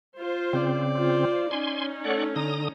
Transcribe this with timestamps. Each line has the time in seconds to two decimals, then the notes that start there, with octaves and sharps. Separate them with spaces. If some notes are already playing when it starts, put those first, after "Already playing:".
0.17 F4 C5
0.53 C#3 C4 D5
0.98 F4 C5
1.51 C#4 D#4 G#5 C6
2.04 A3 C#5 D5 F#5
2.36 D3 A#5 D#6